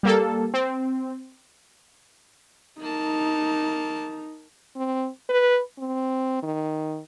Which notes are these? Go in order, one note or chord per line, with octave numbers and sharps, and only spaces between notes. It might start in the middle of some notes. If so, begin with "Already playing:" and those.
G3 A#3 A4
C4
A#3 D#4 A5
C4
B4
C4
D#3